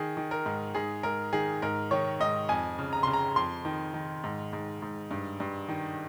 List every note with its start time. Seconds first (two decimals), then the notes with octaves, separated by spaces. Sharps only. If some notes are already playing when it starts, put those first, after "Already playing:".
Already playing: D#3 G#4
0.17 D#3
0.31 A#4
0.46 G#2
0.75 G#2 G#4
1.03 G#2 A#4
1.33 D#3 G#4
1.62 G#2 A#4
1.91 D#3 C#5
2.20 G#2 D#5
2.49 F2 G#5
2.78 C#3
2.93 A#5
3.03 C#3 C6
3.13 A#5
3.36 F2 C6
3.65 D#3
3.94 D#3
4.24 G#2
4.53 G#2
4.82 G#2
5.11 G2
5.40 G2
5.69 D#3